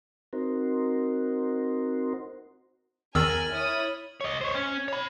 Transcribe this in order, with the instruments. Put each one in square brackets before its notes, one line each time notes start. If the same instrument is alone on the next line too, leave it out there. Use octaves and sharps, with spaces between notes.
[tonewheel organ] C4 D#4 F#4 A#4 C5
[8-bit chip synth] E2 D#3 E6 [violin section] A#4 G#5 [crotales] F6 A6 F#7
[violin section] E4 C#5 D#6
[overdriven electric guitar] C#5 D#5
C5 C#5
C#4
C#5 B5